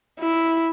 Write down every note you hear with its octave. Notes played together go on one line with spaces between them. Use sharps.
E4